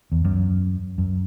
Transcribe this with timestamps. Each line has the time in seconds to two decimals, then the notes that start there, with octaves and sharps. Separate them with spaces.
0.12 E2
0.25 F#2
0.98 F#2